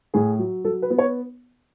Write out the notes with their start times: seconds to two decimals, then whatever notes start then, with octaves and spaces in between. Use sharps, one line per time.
0.14 A2 G#4
0.39 F#3
0.65 F#3 A4
0.82 B4
0.90 B3
0.98 C#5